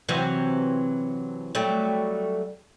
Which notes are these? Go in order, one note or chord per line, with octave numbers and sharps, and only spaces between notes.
C3 E3 F#3
F#3 G3 A3